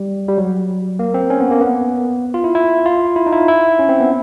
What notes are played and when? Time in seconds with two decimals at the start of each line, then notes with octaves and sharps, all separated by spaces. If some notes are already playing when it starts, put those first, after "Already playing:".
Already playing: G3
0.29 G3
0.38 F#3
0.99 A#3
1.14 C4
1.30 C#4
1.40 B3
1.51 A#3
1.61 B3
2.34 F4
2.44 E4
2.55 E4
2.86 F4
3.16 E4
3.26 D#4
3.33 E4
3.38 F4
3.48 E4
3.79 C#4
3.89 C4
4.00 B3